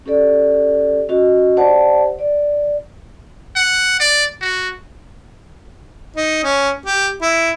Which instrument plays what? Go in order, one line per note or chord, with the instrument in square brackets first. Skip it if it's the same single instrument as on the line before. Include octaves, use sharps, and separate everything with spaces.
[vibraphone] C#4 G4 A4 D5
C#4 F#4 D#5
D4 G4 C5 D5 F#5 A5
D5
[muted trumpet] F#5
D5
F#4
[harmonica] D#4
C#4
G4
E4